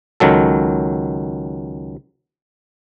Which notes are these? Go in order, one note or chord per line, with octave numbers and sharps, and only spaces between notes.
C#2 D#3 F#3 A4